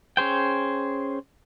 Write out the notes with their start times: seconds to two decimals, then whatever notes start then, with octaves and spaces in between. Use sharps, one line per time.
0.17 C#4 G#4 C5 G5